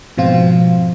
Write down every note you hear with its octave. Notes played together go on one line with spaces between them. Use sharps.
G#2 B2 F3 C4 F4